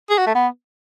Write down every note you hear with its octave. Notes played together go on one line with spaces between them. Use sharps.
G#4
F#4
A3
B3